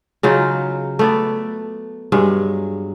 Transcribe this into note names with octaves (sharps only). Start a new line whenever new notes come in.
C#3 F#3 D#4 F4
A3 B3 D5
G2 F#3 G#3